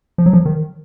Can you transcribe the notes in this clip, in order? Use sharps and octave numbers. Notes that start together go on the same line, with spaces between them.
F3
F#3
F3
D#3